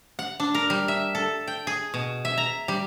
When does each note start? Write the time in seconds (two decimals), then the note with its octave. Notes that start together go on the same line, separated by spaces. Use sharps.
0.19 F#5
0.40 D4
0.55 A#4
0.70 G3
0.88 E5
1.15 A4
1.48 G5
1.67 G#4
1.94 B2
2.25 E5
2.38 A#5
2.68 G3